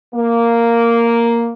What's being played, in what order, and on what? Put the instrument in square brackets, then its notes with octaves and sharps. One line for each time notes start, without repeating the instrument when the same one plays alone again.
[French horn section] A#3